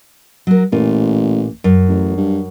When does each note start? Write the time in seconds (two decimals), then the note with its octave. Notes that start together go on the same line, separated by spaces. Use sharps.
0.47 F#3 A#4
0.72 A1 A#2
1.64 F#2
1.89 A1
2.17 G2